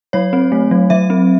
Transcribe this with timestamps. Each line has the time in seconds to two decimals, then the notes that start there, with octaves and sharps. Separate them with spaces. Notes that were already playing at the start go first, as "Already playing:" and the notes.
0.13 F#3 C#5
0.33 C4
0.52 A3
0.71 F#3
0.90 F#3 E5
1.10 C4